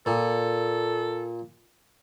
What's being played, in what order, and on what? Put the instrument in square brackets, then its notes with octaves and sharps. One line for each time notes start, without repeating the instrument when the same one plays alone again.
[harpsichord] A#2 [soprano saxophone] A4